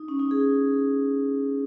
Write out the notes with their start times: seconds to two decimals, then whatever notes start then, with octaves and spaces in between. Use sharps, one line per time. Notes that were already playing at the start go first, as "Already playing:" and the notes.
Already playing: D#4
0.08 C#4
0.19 D#4
0.31 G#4